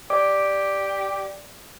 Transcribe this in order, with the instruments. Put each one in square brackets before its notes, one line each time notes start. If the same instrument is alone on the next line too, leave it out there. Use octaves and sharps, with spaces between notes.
[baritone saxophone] G4 [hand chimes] D5 [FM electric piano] D6